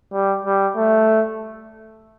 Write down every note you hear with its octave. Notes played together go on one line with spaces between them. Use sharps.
G3
G3
A3